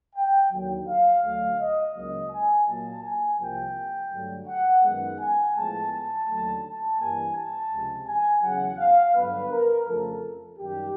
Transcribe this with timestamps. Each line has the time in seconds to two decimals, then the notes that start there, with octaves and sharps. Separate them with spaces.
0.16 G5
0.51 D#2 D3 F#3
0.87 F5
1.23 D2 D3 F#3 A3 F5
1.59 D#5
1.95 C#2 C#3 F#3 A#3 D#5
2.31 G#5
2.67 A#2 F#3 A#3 A5
3.03 G#5
3.39 C2 C3 F3 A#3 G5
4.11 G2 D3 F#3 A3
4.47 F#5
4.82 F#2 D#3 G#3 B3 F#5
5.19 G#5
5.55 A2 F3 G#3 B3 A5
5.91 A5
6.27 D#2 D3 F#3 A3
6.63 A5
6.98 G2 E3 G3 A#3 G#5
7.35 A5
7.71 C#2 C3 F3 G#3
8.06 G#5
8.42 E2 C#3 F#3 F#5
8.79 F5
9.15 G2 D3 F#3 B3 B4
9.50 A#4
9.86 F2 C#3 F3 A3 A4
10.58 F#2 D#3 G3 G4